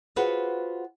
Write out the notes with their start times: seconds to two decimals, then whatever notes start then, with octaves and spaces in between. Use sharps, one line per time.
0.16 F4 F#4 G#4 B4 C5 F#5